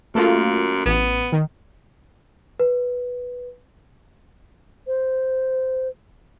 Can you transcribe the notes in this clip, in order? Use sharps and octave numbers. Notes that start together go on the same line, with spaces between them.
F#2 A3 A#3 F4
A1 B3
D#3
B4
C5